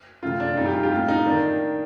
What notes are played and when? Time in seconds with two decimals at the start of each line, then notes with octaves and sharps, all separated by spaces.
0.23 C3 F3 A3 C4 F4
0.40 D4
0.57 A#2 G3 C4 D#4
0.66 G4
0.74 F4
0.83 G4
0.91 A2 A3 C4 F4
1.08 D#4
1.26 D#3 A#3 D4